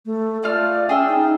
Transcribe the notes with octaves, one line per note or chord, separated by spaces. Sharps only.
A3
A3 F4 D5 F6
C#4 G#4 G5 E6
D#4